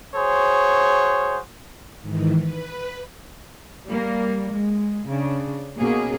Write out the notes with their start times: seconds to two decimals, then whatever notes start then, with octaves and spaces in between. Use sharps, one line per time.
0.16 F#4 G#4 C5 C#5
2.01 G#2 D#3 E3
2.38 B4
3.87 G3 A#3
4.51 G#3
5.08 C#3 D4
5.77 B2 A#3 C#4 G#4